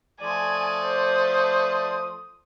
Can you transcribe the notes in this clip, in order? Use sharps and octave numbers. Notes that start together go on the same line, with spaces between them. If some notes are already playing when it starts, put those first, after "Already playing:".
F3 A3 D5 G#5 D#6
C5